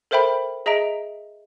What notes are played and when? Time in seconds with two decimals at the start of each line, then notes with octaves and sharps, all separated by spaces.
0.11 A4 A#4 C5 E5 G5 B5
0.66 G#4 D#5 E5 A#5 D7